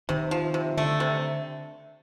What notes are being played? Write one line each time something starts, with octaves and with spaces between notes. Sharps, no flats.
C3 D#3
F3
C3
D3 A3
C3